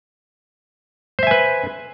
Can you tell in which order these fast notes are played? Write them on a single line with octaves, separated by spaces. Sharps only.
C5 E5 G#5 B4